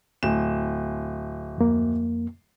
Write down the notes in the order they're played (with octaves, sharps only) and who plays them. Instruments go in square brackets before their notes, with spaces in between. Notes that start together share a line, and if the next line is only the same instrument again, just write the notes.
[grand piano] D1 E7
[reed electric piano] F2 A#3